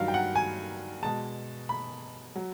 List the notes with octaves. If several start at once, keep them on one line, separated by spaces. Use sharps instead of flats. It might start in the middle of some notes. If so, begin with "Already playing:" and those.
Already playing: G2 D#3 F#3 F5
G5
F#5
G#5
B2 G#3 A5
B5
F#3